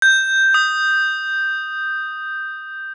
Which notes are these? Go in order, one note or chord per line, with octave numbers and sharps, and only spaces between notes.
G6
D#6